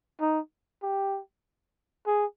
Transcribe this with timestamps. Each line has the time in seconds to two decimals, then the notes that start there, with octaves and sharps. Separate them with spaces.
0.21 D#4
0.83 G4
2.07 G#4